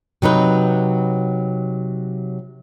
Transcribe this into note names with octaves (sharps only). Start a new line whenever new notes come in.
C3 F#3 D#4 B4